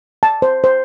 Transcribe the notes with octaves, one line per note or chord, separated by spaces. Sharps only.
A5
C5
C5